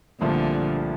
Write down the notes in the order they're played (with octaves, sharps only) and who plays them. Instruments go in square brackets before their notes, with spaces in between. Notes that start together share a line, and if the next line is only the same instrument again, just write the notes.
[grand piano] C2 A#2 F3 A3 [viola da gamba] D3